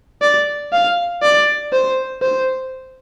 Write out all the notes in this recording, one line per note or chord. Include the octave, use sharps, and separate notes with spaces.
D5
F5
D5
C5
C5